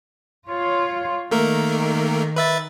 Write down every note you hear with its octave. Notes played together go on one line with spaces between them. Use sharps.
F4 C#5
D#3 A3 A#3 A#4
B4 E5 A6